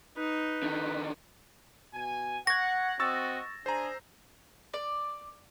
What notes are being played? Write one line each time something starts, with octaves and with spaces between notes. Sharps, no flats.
D#4 B4
D3 D#3
B2 G#5
F#5 C#6 G#6 A#6
C4 F#4 D#5 C#6 E6 A6
D4 G#4 C5 A#5
D5